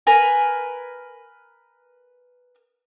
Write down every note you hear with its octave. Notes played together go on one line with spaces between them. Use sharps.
A#4 B4 G#5